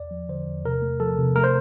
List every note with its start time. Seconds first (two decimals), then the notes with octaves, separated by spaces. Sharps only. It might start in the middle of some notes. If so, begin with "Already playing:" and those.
Already playing: E2 D5
0.11 F3
0.29 D3 C5
0.47 E2
0.65 C3 A#4
0.82 A3
1.00 F3 A4
1.18 C3
1.36 A3 A#4
1.44 C5